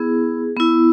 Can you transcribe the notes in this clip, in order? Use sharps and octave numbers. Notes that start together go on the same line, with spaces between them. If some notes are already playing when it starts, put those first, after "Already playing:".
Already playing: B3 E4 G#4
B3 E4